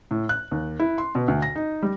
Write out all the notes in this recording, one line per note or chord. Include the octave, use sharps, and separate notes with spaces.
A2
F#6
D#2
E4
C6
B2
D2
A#6
D#4
G3